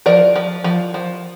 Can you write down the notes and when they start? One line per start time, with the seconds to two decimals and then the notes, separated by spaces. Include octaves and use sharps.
0.06 F3 A#4 D5
0.36 F3
0.64 F3
0.94 F3